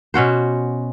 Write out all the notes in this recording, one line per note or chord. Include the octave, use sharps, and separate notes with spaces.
B2 C#4 F#4 C5